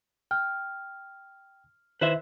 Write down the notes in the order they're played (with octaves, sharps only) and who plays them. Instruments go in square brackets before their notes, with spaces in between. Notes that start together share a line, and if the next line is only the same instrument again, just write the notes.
[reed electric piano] G5 [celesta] F6
[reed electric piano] D#3 E4 [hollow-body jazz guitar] B4 C5 E5